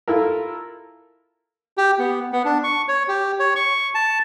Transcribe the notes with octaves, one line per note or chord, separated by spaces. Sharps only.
E4 F4 A4 A#4
G4
B3
B3
D4
C#6
C#5
G4
C#5
C#6
A5